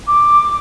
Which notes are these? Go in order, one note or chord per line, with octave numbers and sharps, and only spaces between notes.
D6